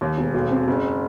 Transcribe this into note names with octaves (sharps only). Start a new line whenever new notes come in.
D#2
E1
B1
C4
F#1